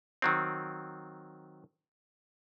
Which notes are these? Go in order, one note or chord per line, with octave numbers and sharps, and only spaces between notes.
D#3 F#3 C4